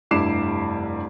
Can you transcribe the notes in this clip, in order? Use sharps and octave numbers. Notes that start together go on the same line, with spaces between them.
F1 G2 E4 D6 C7 E7